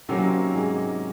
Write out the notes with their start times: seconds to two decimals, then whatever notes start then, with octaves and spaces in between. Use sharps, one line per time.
0.09 C3 D#3 F#3 A#3 C4 C#4
0.54 G#2 G#3